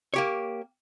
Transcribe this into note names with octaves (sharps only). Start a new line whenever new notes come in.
A#3 G4 C#5